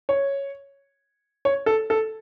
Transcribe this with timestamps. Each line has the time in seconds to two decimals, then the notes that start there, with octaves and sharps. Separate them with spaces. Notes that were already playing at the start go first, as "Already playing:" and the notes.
0.09 C#5
1.45 C#5
1.66 A4
1.90 A4